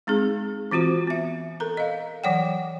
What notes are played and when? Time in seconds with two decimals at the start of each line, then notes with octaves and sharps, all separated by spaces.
0.07 G#3 C4 D#4 G#4
0.71 E3 C4 F4 F#4 C5
1.07 B3 E5
1.60 A4 A#4 A#5
1.77 D#5 F5
2.24 E3 F#3 C#5 D5 F#5 G5